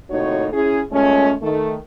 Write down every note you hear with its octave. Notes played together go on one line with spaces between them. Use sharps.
D#2 A2 C3 D#4 F#4 C#5
C#4 E4 G#4
A#2 G#3 A3 C#4
D#3 A3